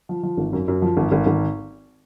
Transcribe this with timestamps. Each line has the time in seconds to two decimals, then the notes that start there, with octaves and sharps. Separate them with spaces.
0.09 F3
0.23 F3
0.37 G#1
0.53 F#2
0.68 F#2
0.82 F3
0.97 G#1
1.12 G#1
1.26 G#1